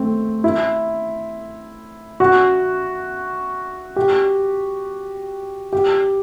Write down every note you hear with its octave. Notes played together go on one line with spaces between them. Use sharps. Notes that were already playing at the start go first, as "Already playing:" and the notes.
Already playing: A3 C4
E4
F#4
G4
G4